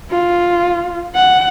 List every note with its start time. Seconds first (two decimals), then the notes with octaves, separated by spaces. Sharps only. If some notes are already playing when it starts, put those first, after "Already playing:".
0.11 F4
1.16 F#5